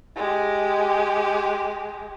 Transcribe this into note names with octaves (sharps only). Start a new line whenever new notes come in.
G#3 G4